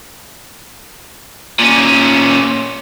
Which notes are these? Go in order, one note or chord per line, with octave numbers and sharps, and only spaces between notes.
A#2 C#4